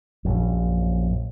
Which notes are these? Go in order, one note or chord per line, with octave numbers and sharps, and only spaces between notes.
A#1 F#2